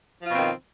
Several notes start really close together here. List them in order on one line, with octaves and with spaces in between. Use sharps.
F3 F4 B2 C4 D#3